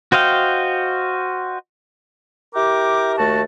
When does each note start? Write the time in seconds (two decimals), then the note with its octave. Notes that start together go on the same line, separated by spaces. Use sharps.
0.12 F#4 C5 D#5 F5 G5
2.55 E4 G4 A#4 G5 D6
3.18 D#2 A3 F#4 A5